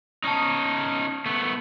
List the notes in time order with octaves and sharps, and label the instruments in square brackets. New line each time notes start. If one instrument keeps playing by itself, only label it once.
[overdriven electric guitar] C#4 D#4 [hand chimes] A5 D#6
[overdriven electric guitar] A3 B3